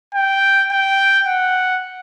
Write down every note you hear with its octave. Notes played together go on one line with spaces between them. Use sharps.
G5
G5
F#5